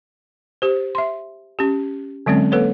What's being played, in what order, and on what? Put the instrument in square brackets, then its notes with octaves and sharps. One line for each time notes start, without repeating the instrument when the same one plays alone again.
[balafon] G4 C5
E5 C6
C#4 G4
D3 F#3 G#3 C4 C#4
A#3 A4 B4 C#5